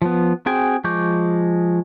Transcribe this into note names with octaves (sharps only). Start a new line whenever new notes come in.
F3 B3
C4 F#4 G#4 G5 G#5
F3 G#3 C#6 D6 G6